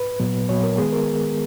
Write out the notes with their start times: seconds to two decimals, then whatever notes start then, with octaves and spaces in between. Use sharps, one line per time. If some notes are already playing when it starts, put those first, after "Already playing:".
Already playing: B4
0.20 A#2 F#3 B3
0.49 A#2 F#3 B3 C#5
0.63 A#4
0.78 D#3 G#3 B3 G#4
0.92 A#4